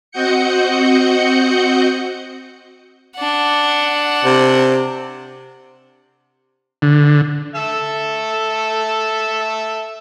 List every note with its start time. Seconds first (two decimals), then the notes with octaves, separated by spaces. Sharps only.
0.12 C4 F#4 D#5 F#5 G6 C#7
3.16 D4 F#5
4.25 C3
6.82 D3
7.56 A4 E5